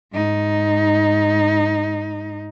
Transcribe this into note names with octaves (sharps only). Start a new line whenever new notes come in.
G#2 D#4